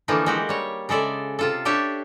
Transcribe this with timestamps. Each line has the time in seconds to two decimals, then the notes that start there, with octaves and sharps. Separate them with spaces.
0.08 D3 E3 F3 A3 A#3 D#4
0.26 G#3 F#4 G4
0.49 G3 C#5
0.89 C#3 G#3 A4 D5 E5
1.39 C3 F4 A4
1.65 D4 G4 C#5 E5 A5